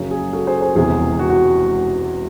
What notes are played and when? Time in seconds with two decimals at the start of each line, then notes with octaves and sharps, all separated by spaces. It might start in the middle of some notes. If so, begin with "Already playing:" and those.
Already playing: F#1 F#2 C#3 F#3
0.11 G#4
0.33 F#4 A4
0.47 G#4 C5
0.61 G#4 C5
0.75 E1 E2 C3 G#4
1.19 F#4
1.30 F#4